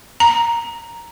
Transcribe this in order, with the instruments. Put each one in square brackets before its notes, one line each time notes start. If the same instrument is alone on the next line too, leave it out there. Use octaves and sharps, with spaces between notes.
[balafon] A#5